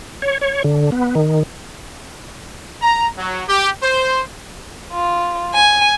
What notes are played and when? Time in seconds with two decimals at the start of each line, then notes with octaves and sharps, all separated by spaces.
0.22 C#5
0.41 C#5
0.64 D3
0.92 B3
1.15 D#3
2.82 A#5
3.18 F#3
3.49 G4
3.83 C5
4.93 F4
5.54 G#5